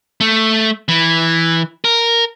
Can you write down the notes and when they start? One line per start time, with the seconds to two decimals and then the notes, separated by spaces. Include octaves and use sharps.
0.20 A3
0.88 E3
1.84 A#4